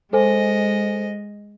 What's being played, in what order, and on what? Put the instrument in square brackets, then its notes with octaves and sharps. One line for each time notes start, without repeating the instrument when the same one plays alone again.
[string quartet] G#3 D#5 [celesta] A4 C5 G#5